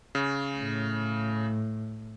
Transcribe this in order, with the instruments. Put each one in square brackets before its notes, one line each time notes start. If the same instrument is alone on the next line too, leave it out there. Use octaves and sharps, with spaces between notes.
[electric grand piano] C#3
[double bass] A2